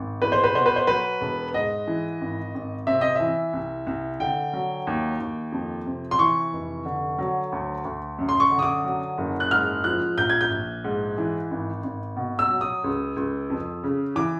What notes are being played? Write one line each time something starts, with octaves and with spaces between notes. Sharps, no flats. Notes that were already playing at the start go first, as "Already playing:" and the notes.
Already playing: G#1
E2 B4
C5
B4
B2 C5
B4
C5
F#3 B4
E1
G#2 D#5
E3
G#1
G#1
C3 E5
D#5
E3 E5
C2
C2
D3 G5
F#3
D#2
D#2
F2
C3
C6
E3 C#6
F1
D3
F#3
D2
D2
F#2
C6
C#6
D3
D#6
D6
F#3
F#1
F#6
G#2 F6
F3 F#6
A#1 G6
G#6
G6
A#1
G#2
E3
G#1
G#1
B2
E6
F#3
D#6
C#2
C#2
F2
C#3
E3 D6